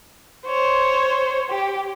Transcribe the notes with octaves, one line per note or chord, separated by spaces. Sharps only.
C5 C#5
G4